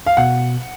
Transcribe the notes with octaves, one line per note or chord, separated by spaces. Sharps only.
F5
B2 F#5